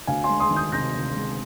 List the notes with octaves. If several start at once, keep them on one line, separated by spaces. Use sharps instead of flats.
D2 F5 G#5
G#5 C6
G#3
C6 D#6
D#3
D#6 G6
C3 G6 A#6
D2
G#3